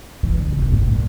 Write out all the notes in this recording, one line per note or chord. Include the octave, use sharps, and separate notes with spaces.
E3
D3
C#3
B2
G2
A2
A#2